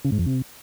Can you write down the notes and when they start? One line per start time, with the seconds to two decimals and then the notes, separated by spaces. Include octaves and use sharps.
0.05 C#3
0.12 G#2
0.19 F2
0.26 C3